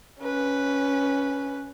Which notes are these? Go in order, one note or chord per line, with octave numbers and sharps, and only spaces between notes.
C#4 B4